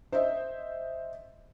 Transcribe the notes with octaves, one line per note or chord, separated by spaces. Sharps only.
C5 D#5 E5